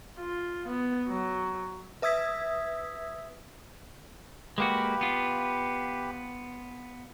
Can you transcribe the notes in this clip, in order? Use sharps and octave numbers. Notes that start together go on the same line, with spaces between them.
F4
B3
F#3
B4 E5 D#6 E6 G#6 B6
G#3 A#3 F#4 G4 B4
B3 F4